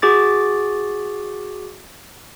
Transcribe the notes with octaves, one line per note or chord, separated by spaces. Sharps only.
F#4 G#4 D6 A6